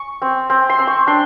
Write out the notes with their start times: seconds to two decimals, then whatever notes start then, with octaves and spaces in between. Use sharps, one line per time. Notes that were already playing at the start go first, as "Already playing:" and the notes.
Already playing: C#6
0.22 C4
0.50 C4
0.70 C6
0.79 C4
0.87 C#6
1.07 D4 C6